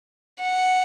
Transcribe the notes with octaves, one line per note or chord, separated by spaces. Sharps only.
F#5